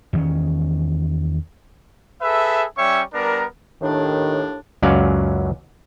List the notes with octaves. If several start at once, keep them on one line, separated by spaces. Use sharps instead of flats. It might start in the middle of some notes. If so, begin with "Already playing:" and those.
E2 D#3 C#4
G#4 A4 B4 E5
G3 C#4 C#5 E5 G5 C#6
G3 B3 D4 A#4
D#2 A2 D#3 D4
C#2 F#2 F#3 C#4 D5 F5